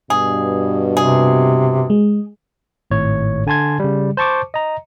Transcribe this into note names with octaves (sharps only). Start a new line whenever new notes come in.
G2 B2 G#4
C3 G#4
G#3
G#1 A2 C#5
D3 G#5 A5 C6 G#6
C#3 G3
C5 A5 C#6 D6
D#5 A#5